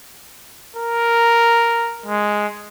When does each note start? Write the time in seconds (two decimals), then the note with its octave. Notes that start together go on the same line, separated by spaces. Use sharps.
0.76 A#4
2.06 G#3